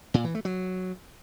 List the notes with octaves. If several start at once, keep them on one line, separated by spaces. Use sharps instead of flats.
A#2
E3
A3
F#3